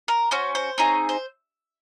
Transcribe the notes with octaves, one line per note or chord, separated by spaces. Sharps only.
A#4
C#4 F#4 C5
C5
C4 D#4 G#4 C#5
C5